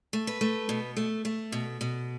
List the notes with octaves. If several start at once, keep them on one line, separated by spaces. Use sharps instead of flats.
A3
B4
A3
B2
A3
A3
B2
B2